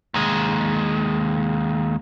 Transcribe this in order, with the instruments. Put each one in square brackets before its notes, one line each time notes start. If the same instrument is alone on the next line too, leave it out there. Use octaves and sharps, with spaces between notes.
[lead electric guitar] D#2 G#3